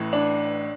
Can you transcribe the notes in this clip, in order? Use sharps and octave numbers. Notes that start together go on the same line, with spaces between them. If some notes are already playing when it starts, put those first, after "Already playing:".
Already playing: A1 A2 E3
D4